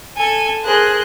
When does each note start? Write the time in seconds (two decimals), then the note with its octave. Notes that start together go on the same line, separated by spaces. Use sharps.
0.16 A4 G#5
0.64 G#4 A#4 C5 F#6